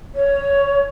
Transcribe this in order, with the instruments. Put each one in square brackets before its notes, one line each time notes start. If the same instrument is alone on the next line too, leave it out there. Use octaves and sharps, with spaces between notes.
[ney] C#5